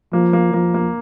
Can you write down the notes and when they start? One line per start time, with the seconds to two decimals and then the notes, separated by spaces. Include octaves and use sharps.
0.13 F3 A#3
0.33 A#3
0.53 F3 A#3
0.74 A#3